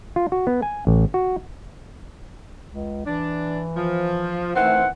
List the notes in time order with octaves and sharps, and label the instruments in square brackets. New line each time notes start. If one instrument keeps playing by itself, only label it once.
[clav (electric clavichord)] F4
F#4
B3
G#5
A1
F#4
[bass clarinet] C#2
[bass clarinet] E3 [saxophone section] D4
[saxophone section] F3
[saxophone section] D#3 E3 C4 [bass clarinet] A3 [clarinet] F#5